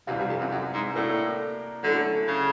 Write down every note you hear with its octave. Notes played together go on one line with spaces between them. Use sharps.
F#2 C3 E3 G3 C4 F4
G2
F2
F#2
F#2
G#2
A2 A#3 D4 F#4 A#4 D5
D3 F#3 A3 C#4 E4 A4
C#3